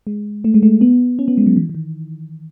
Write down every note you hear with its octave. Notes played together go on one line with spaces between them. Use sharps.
G#3
A3
G#3
A3
B3
C#4
B3
G#3
F#3
E3
E3
D#3